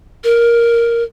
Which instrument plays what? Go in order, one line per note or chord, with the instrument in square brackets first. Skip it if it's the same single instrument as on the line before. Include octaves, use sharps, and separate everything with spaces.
[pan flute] A#4